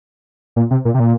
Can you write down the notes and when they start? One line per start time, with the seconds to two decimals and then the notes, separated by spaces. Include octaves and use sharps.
0.56 A#2
0.71 C3
0.85 A#2
0.94 C3
1.00 A#2